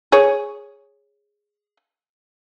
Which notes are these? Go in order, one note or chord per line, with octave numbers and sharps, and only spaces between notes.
G#4 C#5